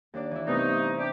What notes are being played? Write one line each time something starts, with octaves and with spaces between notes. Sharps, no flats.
D#2 D4 D5
E3 E4
G2 C3 A3 B3 D#4
D4 G4